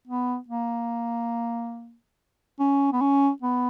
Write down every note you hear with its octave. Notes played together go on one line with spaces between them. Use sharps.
B3
A#3
C#4
B3
C#4
B3